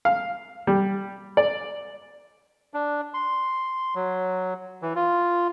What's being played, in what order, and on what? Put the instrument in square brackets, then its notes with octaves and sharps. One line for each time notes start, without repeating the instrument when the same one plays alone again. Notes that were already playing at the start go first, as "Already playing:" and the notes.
[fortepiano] F5
G3
D5
[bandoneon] D4
C6
F#3
E3
F4